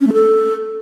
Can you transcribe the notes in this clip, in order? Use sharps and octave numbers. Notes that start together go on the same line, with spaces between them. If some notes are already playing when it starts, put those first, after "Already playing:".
C#4
A3
A4